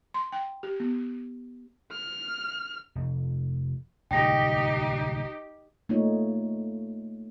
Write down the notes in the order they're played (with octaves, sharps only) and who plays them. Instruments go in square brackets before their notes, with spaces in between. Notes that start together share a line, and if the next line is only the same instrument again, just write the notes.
[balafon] C6
G5
G4
B3
[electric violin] F6
[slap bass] F1
[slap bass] D1 C2 [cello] D#4 G4 [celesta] G5 A#6
[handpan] A3 A#3 D#4 F4 C#5